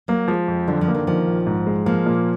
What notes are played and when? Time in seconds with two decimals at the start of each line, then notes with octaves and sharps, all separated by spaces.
0.08 F#3 A#3
0.28 F3 G#3
0.48 F2
0.68 D3 F#3
0.81 F3
0.88 A#3
0.95 D#3
1.07 D#3 F3
1.27 A#1
1.47 G#2
1.67 G#3
1.86 F3 A#3
2.06 A#2